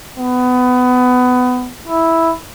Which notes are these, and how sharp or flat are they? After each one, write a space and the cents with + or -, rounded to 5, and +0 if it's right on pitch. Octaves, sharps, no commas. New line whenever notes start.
B3 +20
E4 -5